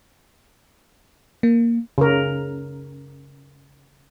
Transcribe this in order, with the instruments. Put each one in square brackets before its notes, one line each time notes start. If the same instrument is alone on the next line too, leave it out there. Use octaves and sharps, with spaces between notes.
[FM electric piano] A#3
[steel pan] C#3 A#4